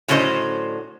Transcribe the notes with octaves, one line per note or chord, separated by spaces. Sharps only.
A2 D3 F#3 C#4 C5 D#5